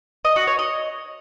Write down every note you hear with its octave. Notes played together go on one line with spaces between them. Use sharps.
D#5
F#4
C#5
D#5